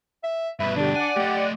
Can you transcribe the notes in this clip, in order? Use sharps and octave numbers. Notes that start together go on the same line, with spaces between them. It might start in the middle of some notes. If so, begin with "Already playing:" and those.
E5
G2 B2 B4 E5
D3 D4 G4
D5 F#5 G#5
A3 G4 D#5